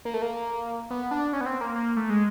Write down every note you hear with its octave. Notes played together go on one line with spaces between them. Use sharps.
A#3
A3
A#3
B3
D4
C#4
B3
C4
A#3
A#3
A3
G#3